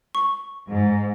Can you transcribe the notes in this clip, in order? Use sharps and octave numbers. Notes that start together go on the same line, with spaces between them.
C#6
G#2